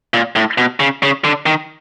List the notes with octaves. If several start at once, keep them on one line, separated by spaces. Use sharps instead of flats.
A#2
A2
B2
C#3
C#3
D3
D#3